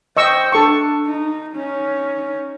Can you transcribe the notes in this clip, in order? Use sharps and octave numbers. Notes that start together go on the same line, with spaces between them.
C5 D#5 G5 C#6 E6
D4 A4 C#6
D#4
C#4 D#4